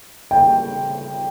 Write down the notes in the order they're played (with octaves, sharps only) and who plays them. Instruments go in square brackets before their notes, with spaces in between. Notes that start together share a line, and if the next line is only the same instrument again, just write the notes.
[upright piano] G5